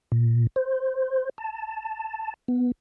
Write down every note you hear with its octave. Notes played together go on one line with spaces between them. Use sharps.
A#2
C5
A5
B3